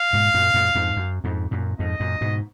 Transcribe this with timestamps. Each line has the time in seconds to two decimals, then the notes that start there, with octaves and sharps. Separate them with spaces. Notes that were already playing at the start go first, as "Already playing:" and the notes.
Already playing: F5
0.13 G#2 B2
0.34 F#2 A#2
0.54 F#2 A#2
0.75 F2 G#2
0.97 F#2
1.24 F2 G#2
1.51 F#2 A#2
1.79 F2 G#2 D#5
2.00 F#2 A#2
2.21 G#2 B2